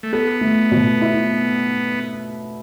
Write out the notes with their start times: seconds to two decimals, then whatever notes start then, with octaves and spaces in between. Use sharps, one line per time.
0.03 A3
0.13 B3 A4
0.41 A3
0.71 B2
1.01 E4